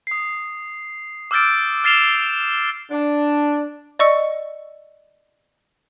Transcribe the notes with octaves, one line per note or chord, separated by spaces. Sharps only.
D#6 C7
D6 E6 F6 G6 A6 D7
F6 A6 C7 E7 F7 G7
D4
D5 D#5 C#6 E6 C#7